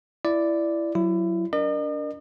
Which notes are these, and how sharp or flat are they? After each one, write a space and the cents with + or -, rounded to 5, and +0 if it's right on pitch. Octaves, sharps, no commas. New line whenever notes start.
E4 +15 D5 +0
F#3 +0 E4 +25
D4 -30 A#4 +0 D#5 -45